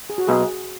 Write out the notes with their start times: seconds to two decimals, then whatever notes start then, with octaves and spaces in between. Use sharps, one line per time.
0.10 G#4
0.18 F#4
0.27 B1 G#4